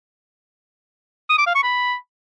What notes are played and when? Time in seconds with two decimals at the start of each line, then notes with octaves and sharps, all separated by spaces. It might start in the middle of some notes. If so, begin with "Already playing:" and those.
1.29 D#6
1.38 D6
1.46 F5
1.55 C#6
1.63 B5